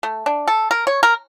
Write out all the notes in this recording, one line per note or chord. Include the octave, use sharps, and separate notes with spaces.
A3
D4
A4
A#4
C#5
A#4